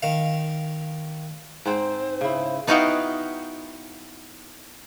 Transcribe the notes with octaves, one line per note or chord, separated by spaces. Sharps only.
D#3 F5
G#2 C4 C5
C#3 E4
B3 D#4 E4 F#4 F5 G5